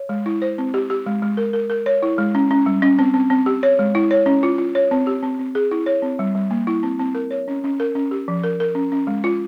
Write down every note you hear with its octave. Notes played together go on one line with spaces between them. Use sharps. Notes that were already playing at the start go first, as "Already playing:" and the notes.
Already playing: C#5
G#3
E4
C5
C4
G4
G4
G#3
G#3
A#4
A#4
A#4
C#5
E4
G#3
C#4
C#4
G3
C#4
C4
C4
C4
G4
C#5
G#3
E4
C#5
C#4
F4
F4
C#5
C4
G4
C4
C4
G#4
E4
C#5
C4
G3
G3
A#3
E4
C4
C4
A#4
C#5
C#4
C#4
A#4
C#4
G4
F3
A#4
A#4
C#4
C#4
G#3
F4